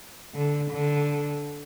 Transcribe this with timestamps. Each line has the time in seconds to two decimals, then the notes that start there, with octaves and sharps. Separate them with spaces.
0.35 D3
0.71 D3